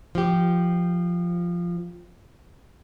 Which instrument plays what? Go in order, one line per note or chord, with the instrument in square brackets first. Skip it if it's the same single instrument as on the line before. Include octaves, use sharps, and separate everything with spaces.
[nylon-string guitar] F3 G4